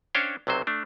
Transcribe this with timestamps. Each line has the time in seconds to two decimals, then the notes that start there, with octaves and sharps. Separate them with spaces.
0.15 C#4 D4 C5 C#5 F5 G5
0.47 B1 C3 F#3 C5
0.67 A3 D4